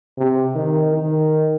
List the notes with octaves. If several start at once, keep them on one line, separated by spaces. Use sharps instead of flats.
C3
D#3
D#3